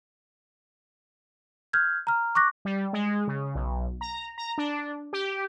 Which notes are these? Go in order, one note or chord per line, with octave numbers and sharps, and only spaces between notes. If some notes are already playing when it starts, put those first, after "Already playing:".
F6 G6 G#6
A#5 F6
C#6 D6 F#6 A#6
G3
G#3
C#3
B1
A#5
A#5
D4
G4